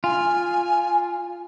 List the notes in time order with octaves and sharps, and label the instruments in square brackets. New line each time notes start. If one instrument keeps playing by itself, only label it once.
[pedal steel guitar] F4 [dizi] G#5